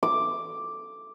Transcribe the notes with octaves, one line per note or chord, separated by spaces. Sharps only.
D6